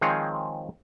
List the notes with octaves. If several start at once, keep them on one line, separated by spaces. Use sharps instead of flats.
D#3 F3 G#3 C4 G#4 C#5